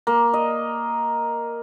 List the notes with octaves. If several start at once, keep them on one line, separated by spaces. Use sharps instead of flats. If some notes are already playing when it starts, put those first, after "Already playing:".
A#3
D#5